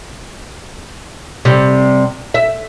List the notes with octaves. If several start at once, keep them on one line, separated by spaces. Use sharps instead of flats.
C3 G3
E5